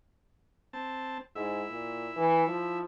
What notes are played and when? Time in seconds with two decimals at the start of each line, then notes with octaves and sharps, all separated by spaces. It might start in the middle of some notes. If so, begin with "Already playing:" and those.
0.73 C4 A5
1.36 G#2 E4 E5
1.70 A#2
2.16 E3
2.47 F3